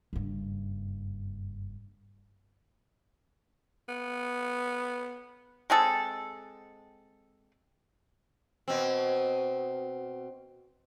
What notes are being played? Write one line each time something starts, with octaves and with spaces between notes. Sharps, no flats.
F#1 G2
B3
G#3 C4 G#4 A4
B2 C4